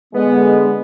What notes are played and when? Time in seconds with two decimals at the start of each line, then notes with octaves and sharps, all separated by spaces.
0.14 D3 G#3 B3